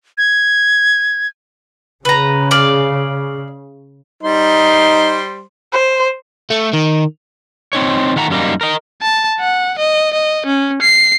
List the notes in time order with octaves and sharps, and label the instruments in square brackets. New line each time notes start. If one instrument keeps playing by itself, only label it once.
[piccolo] G#6
[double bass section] C#3 [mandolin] B4 A#5
[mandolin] D5 F5
[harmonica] G3 C5 C6 [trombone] D#4
[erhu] C5
[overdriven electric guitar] A3
D#3
[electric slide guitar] C4 D#4 C#5
D#3 A3 F#5 A#5
F#2 G3 A#3 D#4
A#4 D#5
[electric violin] A5
F#5
D#5
D#5
C#4
C7